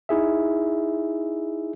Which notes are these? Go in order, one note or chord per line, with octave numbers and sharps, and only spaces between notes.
D#4 E4 G#4 E5